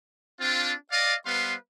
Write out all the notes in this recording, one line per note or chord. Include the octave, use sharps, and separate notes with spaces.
C4 D4 F4
D5 D#5 F5
G3 B3 B4 C5 F5 C6